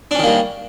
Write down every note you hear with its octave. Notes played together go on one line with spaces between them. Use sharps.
D#3 G3 A#3 C#4 D4